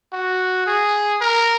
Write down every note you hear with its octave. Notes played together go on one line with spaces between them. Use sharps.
F#4
G#4
A#4